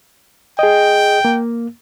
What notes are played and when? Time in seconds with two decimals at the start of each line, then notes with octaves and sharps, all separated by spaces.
0.59 G#4 D#5 G5
1.25 A#3